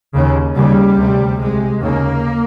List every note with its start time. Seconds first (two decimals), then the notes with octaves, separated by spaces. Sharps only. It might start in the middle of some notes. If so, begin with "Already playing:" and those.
0.14 D#2 C#3
0.55 D#2 C#3 G3
0.98 D2 C3
1.40 C2 C3 G#3
1.81 D#2 C#3 A#3